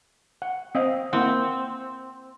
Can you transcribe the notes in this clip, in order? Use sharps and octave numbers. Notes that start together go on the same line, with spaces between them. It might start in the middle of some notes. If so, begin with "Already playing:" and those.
F#5
C4 D#5 F5
A#3 C4 E4 F#5